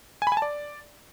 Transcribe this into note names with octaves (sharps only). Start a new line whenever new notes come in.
G#5
B5
G#5
A5
D5